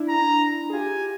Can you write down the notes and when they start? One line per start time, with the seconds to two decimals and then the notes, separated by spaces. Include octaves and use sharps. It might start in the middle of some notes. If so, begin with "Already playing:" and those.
Already playing: D4 E4
0.09 A#5
0.70 G#4
0.73 F4 G4 G#5